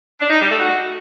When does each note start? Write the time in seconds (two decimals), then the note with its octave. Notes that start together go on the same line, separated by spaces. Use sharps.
0.20 D4
0.30 D#4
0.40 G3
0.49 A3
0.59 F#4